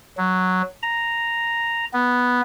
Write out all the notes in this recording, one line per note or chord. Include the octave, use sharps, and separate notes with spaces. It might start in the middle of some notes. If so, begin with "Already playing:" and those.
F#3
A#5
B3